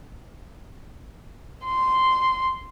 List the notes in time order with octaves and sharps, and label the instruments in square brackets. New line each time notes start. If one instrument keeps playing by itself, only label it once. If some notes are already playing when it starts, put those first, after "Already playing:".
[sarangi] C6